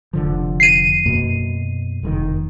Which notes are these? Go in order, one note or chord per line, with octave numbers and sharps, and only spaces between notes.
F1 D3 F3
C7 D#7
F#2 B2 A#3
F1 G#2 D#3